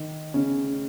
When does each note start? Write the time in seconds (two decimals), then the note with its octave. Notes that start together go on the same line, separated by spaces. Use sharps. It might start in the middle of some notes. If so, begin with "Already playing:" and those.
Already playing: D#3 D#4
0.34 C#3 C#4